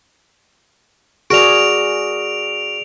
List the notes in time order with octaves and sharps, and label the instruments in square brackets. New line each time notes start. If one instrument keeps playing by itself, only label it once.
[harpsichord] F#4 A#4 [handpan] G#4 D5 [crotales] D7 F7